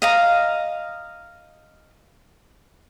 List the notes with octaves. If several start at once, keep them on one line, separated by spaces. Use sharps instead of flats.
D#5 F5 A#5